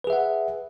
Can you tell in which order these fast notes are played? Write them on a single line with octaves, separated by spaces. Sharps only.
B4 G#4 E5 F#5